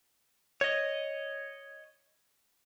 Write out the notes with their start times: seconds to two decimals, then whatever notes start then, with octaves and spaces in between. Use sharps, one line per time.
0.61 C#5 D#5